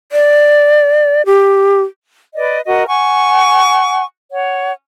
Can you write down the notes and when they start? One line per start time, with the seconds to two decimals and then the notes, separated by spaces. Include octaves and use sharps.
0.12 D5
1.26 G4
2.34 B4 D5 D#5
2.65 F#4 A#4 D#5
2.88 F#5 G#5 C#6
4.31 C#5 F#5